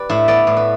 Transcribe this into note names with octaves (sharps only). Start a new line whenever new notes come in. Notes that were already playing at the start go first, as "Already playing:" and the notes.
Already playing: G4 B4 D5
A2 E4
B3 D5
A2
B4